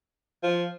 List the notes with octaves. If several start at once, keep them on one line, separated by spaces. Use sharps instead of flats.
F3